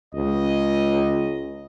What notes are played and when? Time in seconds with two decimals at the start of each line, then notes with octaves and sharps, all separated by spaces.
0.15 C#2 D#5